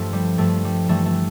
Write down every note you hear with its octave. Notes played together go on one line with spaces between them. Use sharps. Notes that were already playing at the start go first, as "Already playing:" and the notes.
Already playing: G2 F3 A3
G3
G2 F3 A3
G3
G2 E3 G3 A3
A3